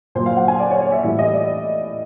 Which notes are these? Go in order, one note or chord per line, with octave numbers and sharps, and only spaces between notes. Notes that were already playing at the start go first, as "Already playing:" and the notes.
A#2 F#3 C5
F5
F#5
G#5
D5
C#5
C#5
E5
A2 E3 G3 E5
D#5
D5